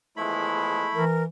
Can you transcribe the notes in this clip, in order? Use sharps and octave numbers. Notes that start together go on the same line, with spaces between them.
E2 F3 G#3 A3 E4 B5
E3 A#4